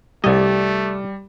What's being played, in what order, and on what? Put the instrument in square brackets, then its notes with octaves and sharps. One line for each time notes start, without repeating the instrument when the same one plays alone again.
[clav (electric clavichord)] C2 D#5 [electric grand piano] G3 [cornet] A3 [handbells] G4 D5